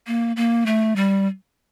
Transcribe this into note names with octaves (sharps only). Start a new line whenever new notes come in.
A#3
A#3
A3
G3